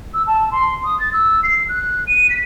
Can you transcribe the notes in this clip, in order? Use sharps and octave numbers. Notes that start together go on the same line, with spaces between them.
E6
A5
C6
D#6
A6
E6
C7
F#6
D#7
B6